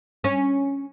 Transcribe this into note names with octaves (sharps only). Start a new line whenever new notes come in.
C#4